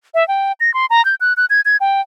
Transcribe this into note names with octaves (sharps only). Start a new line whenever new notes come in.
E5
G5
A#6
C6
A#5
G6
F#6
F#6
G#6
G#6
G5